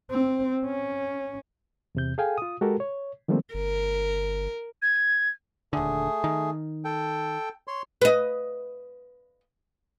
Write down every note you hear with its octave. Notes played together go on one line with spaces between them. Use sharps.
C4
C#4
E2 C3 G6
G#4 A4 F5 G5 G#5
F4 D#6
G#3 F#4 G4 A4 A#4
C#5
D#3 F3 G3 A3 A#3 C4
G1 A#4
G#6
D#1 D3 A3 G#4
D#3
A4 G5
C#5 C6
B4 D#5